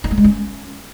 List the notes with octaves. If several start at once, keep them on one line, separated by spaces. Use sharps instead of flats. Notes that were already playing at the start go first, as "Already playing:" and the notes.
D#4
A3
G#3
C#4